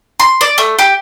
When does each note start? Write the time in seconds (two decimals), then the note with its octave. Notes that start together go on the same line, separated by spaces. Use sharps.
0.20 C6
0.41 D5
0.58 A3
0.79 G4